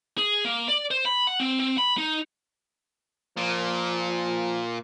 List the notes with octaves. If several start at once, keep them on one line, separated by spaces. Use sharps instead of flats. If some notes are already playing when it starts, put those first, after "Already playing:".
G#4
A#3
D5
C5
B5
F#5
C4
C4
B5
D#4
A#2 F3